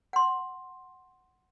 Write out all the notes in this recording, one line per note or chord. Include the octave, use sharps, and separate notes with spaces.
F#5 C6